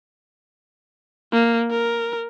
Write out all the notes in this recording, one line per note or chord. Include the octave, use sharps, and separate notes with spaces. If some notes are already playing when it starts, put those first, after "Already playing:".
A#3
A#4